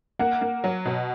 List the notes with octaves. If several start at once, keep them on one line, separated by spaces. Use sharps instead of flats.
A#3 F#5
A#3
F#3
B2